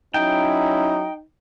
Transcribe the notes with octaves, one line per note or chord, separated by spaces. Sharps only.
F#3 C#4 D#4 E4 G5